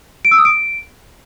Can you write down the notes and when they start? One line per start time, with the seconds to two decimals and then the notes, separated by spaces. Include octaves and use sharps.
0.25 D7
0.31 E6
0.38 D#6
0.45 D7